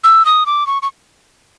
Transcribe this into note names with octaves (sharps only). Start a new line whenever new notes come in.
E6
D#6
D6
C#6
C#6